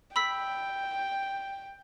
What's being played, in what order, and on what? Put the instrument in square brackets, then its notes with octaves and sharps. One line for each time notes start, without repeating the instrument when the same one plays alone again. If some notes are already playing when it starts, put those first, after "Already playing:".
[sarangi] G5 [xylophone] B5 E6 B6